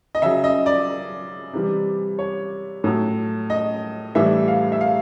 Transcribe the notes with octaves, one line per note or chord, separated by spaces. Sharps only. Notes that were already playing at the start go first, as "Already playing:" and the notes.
D#5
C#3 F#3 E5
D#5
D5
C3 E3 G3
C#5
A2 F#3
D#5
A2 E3 G3 E5
F5
E5
F5